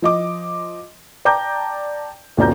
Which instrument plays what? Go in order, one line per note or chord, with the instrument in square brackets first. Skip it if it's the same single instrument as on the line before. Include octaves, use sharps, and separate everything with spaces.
[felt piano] F3 D#5 D6
D5 G5 A5 A#5 D6 G6
D#1 B2 C#4 D5 A#5 G6